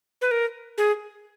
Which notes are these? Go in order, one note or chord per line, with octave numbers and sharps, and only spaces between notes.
B4
A#4
G#4